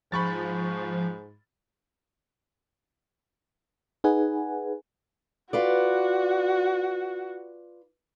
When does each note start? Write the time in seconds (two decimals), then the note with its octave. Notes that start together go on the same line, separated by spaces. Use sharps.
0.12 G#2 F3 B5 C#6 A6
4.04 D#4 G#4 B4 F#5 G#5
5.53 F4 F#4 B4 D5